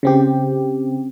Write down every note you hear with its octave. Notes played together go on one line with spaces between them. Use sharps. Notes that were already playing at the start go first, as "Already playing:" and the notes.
C#3 C4 G4